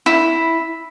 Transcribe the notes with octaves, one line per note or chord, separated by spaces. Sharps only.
E4